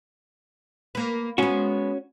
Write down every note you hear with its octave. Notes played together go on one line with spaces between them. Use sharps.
A#3 B4
G#3 B3 C#4 F#4